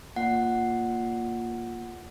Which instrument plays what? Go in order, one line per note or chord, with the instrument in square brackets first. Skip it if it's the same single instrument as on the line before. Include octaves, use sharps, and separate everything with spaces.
[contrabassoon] A#2 [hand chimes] F#5